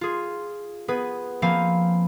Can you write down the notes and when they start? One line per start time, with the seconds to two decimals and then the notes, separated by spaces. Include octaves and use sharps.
0.01 F4 G#4
0.88 B3 G#4 B4
1.42 F3 A#3 C4 F5 G#5 B5